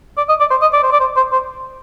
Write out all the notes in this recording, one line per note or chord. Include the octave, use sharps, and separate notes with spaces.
D5
D#5
D5
C5
D#5
D5
C5
D5
C5
C5
C5